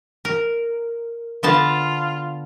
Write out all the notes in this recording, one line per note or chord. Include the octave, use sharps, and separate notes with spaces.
A#4
D3 B3 F4 A5